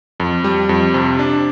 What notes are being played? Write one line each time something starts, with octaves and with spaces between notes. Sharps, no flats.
F2
G3
F2
C3
D4